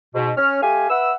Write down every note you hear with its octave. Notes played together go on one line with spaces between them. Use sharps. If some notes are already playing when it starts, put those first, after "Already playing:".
G#2 B2
C#4 F6
A3 G4 F5 G#5
B4 E5 F#5 E6